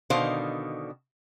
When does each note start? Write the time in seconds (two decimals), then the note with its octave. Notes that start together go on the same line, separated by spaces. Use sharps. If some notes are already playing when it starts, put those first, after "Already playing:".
0.10 B2 D3 D#3 C5 F5